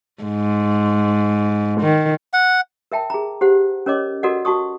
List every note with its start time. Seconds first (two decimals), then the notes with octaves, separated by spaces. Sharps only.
0.23 G#2
1.80 D#3
2.33 F#5
2.92 A#4 E5 G5 A5
3.10 G#4 A#5
3.41 G4 C5 F#5
3.86 C#4 A#4 C#5 D#5 D6
4.23 F#4 A4 A#4 D5 D#5 F#5
4.45 F#4 A5 C#6 D#6